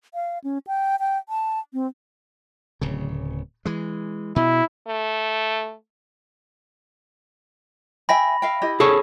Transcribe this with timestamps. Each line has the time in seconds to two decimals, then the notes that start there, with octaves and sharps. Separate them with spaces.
0.14 F5
0.44 C#4
0.67 G5
1.00 G5
1.29 A5
1.73 C4
2.81 D1 C#3
3.65 E3 G#3
4.36 B2 E4
4.88 A3
8.09 E5 G5 G#5 B5 A#6
8.42 E5 F5 G5
8.62 E4 G4 D#5
8.80 G#4 A4 C#5